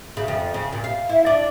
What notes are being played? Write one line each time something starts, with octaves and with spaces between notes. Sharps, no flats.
C#3
F2
C#3
A#2
F5
E4
D4